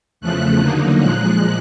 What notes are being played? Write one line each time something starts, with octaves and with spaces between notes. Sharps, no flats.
E2 C#3 F3 A3 F#6
D3 F#3 A#3 D#4
A#2 F3 G#3 F#6